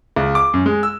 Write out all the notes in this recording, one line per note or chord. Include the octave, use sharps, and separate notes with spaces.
C#2
D6
F#2
G#3
E6